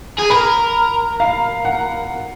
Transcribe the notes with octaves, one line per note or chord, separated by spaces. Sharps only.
G#4
A#4 B5
F5
F#5